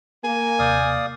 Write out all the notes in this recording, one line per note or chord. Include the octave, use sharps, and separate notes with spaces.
A#3 G#5
D#2 C3 D5 F5 D#6 G6